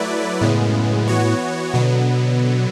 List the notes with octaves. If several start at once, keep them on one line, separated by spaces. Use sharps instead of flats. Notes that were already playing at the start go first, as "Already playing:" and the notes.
Already playing: F#3 A3 E4 B4 D5
F#2 A2 C#3 G#3 B3
E3 B3 F#4 C#5
B2 D3 F#3 B3